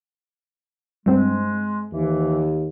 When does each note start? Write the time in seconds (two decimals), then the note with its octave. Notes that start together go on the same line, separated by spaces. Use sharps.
1.06 G2 G#3 C4
1.92 D#2 E3